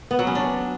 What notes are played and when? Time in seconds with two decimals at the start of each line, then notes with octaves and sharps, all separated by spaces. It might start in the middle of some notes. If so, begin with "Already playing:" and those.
0.11 B3
0.19 F#3
0.27 C#4
0.35 D4